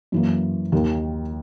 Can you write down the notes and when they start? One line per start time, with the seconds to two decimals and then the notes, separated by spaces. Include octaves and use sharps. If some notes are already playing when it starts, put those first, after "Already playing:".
0.12 F#2 E3 A#3
0.72 D#2 D#3 A#3